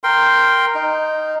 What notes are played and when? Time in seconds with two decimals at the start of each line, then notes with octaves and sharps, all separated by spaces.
0.04 A#4 G5 C6
0.75 D#4